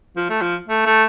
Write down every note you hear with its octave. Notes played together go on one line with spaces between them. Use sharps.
F3
A3
F3
A3
A3